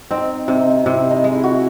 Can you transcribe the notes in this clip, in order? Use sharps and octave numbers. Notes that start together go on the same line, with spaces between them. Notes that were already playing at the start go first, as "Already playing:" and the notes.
C4 D#4
C3 D#4
C3 E4
D#4
G#3
E4
F#4
E4